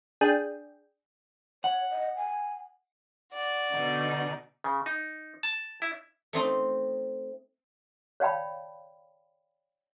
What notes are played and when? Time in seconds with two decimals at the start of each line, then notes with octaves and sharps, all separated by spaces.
0.21 D4 G#4 G5
1.64 C#5 F#5
1.92 D#5
2.16 G#5
3.33 F#4 D5
3.71 B2 D3 D#4
4.64 C#3
4.86 D#4
5.43 A5
5.82 E4
6.33 A3 C4 D#4
8.20 C#5 D5 F5 G5 A5 B5